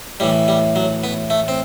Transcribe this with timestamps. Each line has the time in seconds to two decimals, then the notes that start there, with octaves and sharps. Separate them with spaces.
0.20 A2 E3 G3
0.48 G3
0.76 F#3
1.04 B3
1.30 A3
1.48 C4